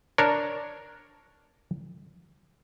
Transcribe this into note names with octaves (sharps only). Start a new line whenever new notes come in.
D4 A#4 C#5